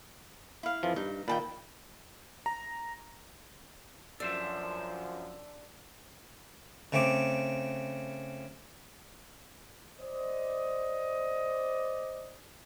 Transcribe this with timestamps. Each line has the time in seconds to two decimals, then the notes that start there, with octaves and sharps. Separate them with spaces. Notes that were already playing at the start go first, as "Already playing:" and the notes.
0.63 E4 F5
0.83 F2 E3 F3
0.96 G2 D#4
1.28 A#2 D#3 A#3 G5 A5 B5
2.46 A#5
4.20 F#2 F3 D4 A4 C5 E5
6.92 C#3 A3 C4 D6
9.99 C5 D5 D#5